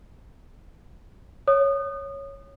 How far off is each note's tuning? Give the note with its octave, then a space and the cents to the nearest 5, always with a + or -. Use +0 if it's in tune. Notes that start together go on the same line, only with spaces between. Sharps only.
C#5 +0 D#6 -30